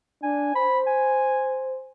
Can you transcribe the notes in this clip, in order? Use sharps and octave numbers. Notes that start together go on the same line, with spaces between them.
D4 G#5
C5 B5
G#5